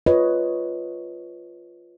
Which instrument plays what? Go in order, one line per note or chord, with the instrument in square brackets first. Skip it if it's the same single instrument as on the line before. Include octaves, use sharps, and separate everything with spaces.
[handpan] F4 B4 C#5 D#5